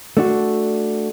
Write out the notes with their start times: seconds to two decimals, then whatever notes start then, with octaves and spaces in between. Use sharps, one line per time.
0.17 A3 D4 F#4